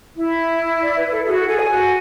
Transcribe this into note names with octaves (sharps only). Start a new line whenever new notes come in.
E4
D5
B4
A4
F#4 G#4
A4
G#4 A4
G#4 G#5
F#4